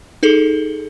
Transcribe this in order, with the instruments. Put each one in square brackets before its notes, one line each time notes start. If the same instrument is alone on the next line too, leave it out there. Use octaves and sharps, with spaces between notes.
[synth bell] D#4 G#4 A4